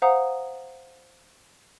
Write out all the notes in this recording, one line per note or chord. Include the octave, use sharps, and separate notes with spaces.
C5 F5 F#5 A#5 D#6